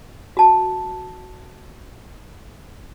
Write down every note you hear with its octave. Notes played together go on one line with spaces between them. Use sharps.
F#4 A5